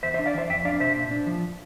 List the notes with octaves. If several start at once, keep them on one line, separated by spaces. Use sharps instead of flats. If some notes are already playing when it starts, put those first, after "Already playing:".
E2 C5 E5
C5 E5
D4
D5 F5
E3 C5 E5
F2 E5 G5
D4 D5 F5
C3 C5 E5
A#2
D4
F3